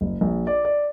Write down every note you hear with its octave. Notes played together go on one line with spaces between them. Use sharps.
F#1
A#1
D5
D5